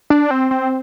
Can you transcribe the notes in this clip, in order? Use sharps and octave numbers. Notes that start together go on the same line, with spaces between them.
D4
C4
C4